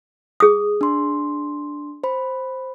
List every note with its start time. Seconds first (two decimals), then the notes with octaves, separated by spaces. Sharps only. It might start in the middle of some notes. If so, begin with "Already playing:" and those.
0.40 G#4 D#6
0.81 D4 C6
2.04 C5 B5